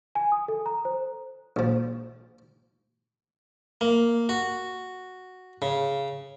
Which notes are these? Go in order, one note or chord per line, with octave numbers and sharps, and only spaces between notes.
G#5
D#6
A4
A#5
C5
A#1 F3
A#3
F#4
C#3